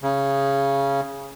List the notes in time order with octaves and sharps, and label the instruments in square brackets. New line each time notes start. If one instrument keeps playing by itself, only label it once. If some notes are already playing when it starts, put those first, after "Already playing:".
[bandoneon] C#3